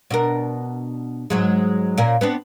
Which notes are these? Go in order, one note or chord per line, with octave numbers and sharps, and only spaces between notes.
B2 D4 A#4
G#2 F#3 G#3
A#2 C#4 A#4
B3 C4 D4